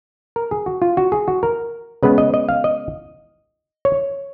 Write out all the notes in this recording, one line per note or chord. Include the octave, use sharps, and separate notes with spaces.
A#4
G#4
F#4
F4
F#4
G#4
F#4
A#4
C#3 G#3 B3 B4
D#5
D#5
F5
D#5
C#5